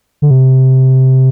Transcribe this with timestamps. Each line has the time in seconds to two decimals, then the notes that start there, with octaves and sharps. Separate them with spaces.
0.22 D3
0.31 C3